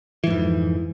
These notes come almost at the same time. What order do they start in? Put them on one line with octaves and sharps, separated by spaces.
E3 G#2 F2